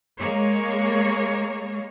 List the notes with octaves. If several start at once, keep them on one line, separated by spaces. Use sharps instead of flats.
G#3 A#3 C#5